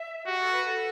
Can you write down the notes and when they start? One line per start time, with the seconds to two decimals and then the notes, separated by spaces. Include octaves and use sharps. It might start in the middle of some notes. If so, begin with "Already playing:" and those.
Already playing: E5
0.26 F#4 G4
0.39 A4
0.51 B4
0.64 A4